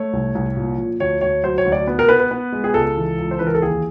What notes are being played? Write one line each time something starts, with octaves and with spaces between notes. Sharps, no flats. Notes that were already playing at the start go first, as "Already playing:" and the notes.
Already playing: A3 C#5
C2
C2
A#2
F3
D2 C#5
D2 C#5
F#3 C5
C#5
D2
D5
B3
A#4
B3 B4
B4
B3
G#3
G#4
C#2 A4
E3
C#2
C5
E3 B4
A#4
A4
D#2 G#4